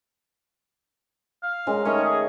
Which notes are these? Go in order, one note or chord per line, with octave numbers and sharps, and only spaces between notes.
F5
G#3 C#4 A#4
D#3 A3 C#4 D#5
G#4